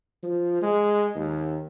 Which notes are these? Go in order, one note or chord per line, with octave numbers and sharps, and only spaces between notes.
F3
G#3
D#2